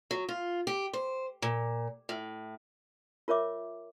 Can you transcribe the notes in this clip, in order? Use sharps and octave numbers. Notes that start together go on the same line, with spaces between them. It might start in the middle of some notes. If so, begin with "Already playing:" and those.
F#3
F4
G4
C5
A#2
A2
F4 A#4 C#5 E5 D6